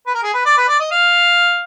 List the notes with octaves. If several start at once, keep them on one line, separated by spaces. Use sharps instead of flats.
B4
A#4
G#4
B4
D5
B4
D5
D#5
F5